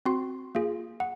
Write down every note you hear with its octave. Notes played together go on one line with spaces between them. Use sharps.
C4 F#4 C6
A#3 F4 G#4
F#5